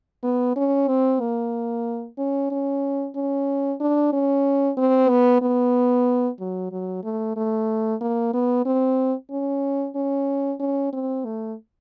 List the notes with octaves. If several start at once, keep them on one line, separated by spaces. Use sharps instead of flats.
B3
C#4
C4
A#3
C#4
C#4
C#4
D4
C#4
C4
B3
B3
F#3
F#3
A3
A3
A#3
B3
C4
C#4
C#4
C#4
C4
A3